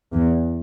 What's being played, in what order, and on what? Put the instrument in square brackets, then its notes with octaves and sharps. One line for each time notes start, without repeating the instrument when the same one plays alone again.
[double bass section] E2